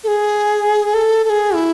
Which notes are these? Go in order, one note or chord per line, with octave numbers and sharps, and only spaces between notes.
A4
G#4
A4
A4
G#4
E4